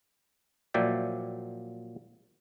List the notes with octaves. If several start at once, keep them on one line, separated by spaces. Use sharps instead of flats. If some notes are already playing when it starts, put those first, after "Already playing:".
A#2 F3 F#3 D5 E5 G5